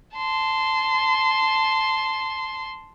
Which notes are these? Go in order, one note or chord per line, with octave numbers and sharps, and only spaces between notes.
A5 C6